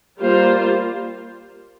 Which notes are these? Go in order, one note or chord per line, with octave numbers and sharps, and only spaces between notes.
G3 A#3 F4 C5